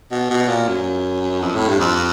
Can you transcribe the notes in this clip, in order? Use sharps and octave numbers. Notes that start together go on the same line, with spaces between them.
B2
B2
A#2
F#2
F2
A2
G2
F2